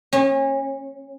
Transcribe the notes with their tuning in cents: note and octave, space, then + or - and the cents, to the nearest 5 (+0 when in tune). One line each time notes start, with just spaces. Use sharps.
C#4 -30